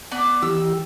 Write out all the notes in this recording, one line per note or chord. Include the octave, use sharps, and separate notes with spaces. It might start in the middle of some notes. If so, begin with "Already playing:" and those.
B3 D5
E3 G4 E6